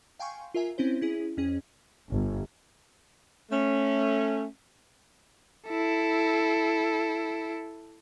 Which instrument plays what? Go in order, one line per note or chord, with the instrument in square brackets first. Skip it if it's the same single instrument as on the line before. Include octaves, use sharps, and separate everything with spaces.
[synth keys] F5 G5 G#5 C6 C#6
F4 A#4 E5 G#5
C4 C#4 E4 C5
C#4 E4 G#4
F2 C#4 G#4
[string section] G1
[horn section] A3 C#4
[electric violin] E4 A4